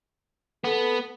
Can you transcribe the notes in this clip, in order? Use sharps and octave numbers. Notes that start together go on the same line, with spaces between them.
B3 A4